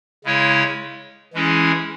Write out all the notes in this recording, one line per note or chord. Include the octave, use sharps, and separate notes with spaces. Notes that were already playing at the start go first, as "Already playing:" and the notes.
C#3 G#3 E4 C#5
E3 G#3 C#4 E4 G#4